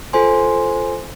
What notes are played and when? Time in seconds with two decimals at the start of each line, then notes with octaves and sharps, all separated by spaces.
0.13 F4 A4 C5 G#5 C6